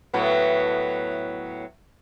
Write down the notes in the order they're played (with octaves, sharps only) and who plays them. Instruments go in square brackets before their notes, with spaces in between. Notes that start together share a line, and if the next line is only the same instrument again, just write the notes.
[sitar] A2 F#3 B3